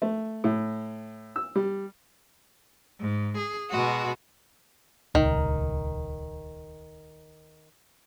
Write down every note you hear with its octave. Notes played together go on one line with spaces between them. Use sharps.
A3
A2
E6
G3
G#2
G#4
B2 G#3 F#4
D#1 C#2 D#3